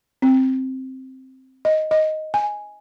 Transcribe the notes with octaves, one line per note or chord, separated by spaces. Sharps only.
C4
D#5
D#5
G#5